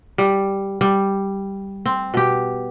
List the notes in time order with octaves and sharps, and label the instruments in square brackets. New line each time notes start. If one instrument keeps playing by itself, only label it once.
[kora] G3
G3
C4
B2 G4